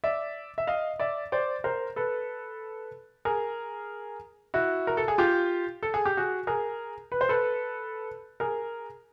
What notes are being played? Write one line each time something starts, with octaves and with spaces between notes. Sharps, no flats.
D5 E5
E5
D#5 F5
D5 E5
C5 D5
A#4 C5
A4 B4
G#4 A#4
E4 F#4
A#4
A4
G#4
F4 G4
A4
G#4
G4
F#4 G#4
G#4 A#4
B4
C5
A4 B4
G#4 A#4